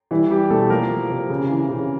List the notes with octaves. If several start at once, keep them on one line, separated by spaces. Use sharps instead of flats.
E3 G3 E4
G3 G4
B2 A3 A4
F3 A#3 A#4
F3
C3
C#3
E3
C#3